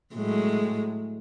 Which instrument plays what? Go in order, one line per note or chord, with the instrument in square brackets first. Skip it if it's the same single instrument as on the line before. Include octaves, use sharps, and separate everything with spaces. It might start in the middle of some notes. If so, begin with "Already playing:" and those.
[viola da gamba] A2 F#3 G#3